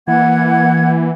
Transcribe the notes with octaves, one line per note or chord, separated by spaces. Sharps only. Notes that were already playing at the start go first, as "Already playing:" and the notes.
E3 A#3 F#5 G#6